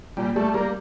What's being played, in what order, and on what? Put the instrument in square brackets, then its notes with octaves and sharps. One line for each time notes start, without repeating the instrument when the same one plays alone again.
[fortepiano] A#2 [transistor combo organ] G3
[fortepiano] G3 [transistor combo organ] A3
[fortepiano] G3 [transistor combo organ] A#3